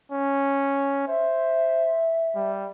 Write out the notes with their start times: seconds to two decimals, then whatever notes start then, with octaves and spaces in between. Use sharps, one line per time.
0.12 C#4
1.08 C5 E5
2.35 G3